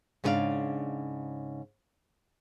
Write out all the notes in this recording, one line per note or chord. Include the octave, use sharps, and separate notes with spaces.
G#2 C#3 B3 D4 D5 F5